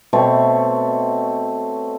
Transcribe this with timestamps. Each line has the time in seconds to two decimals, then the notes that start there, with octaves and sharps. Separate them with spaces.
0.13 B2 A3 C4 C#5